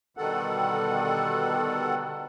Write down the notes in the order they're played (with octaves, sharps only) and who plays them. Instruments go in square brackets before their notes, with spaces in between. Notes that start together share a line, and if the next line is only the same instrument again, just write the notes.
[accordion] B2 D3 D#3 G3 A4 F#5